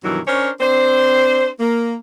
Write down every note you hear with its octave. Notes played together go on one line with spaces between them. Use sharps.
G2 B2 D#3 E3 F#3
C#4 D4 A#4 C5 C#5
C4 D4 C5
A#3